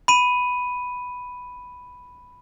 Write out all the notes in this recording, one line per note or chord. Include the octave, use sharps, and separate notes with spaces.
B5 D#7